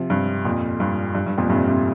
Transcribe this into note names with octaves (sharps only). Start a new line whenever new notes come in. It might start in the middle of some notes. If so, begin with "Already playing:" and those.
Already playing: C3 F3
G2 C3
F2 A#2
G2
G2
G2
F2 A#2
G2 C3
G2 C3